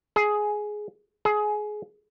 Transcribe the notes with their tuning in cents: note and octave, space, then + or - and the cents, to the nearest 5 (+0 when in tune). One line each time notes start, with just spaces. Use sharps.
G#4 +10
G#4 +20